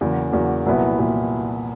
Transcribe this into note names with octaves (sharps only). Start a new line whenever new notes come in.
E2 C#3 F#3 A#3
E2 C#3 F#3 A#3
C2 A#2 F#3 B3 E4
A#2 F#3 B3 E4